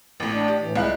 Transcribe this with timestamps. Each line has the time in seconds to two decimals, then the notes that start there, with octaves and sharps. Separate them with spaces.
0.20 A1 A2
0.34 D4 D5
0.48 G4
0.61 A2 E3
0.76 C#2 G3 G#3 E4 F5 F#6